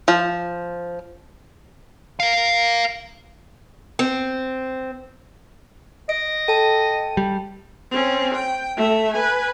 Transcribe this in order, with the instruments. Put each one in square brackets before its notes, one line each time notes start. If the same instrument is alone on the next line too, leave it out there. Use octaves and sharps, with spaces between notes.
[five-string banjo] F3
[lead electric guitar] A#4 F5
[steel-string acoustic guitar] C4
[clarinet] D#5 [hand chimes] D7
[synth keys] A4 D#7 [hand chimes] G5 A5
[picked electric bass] G3
[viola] C4 C#4
G5
A3 E5
B4 G#5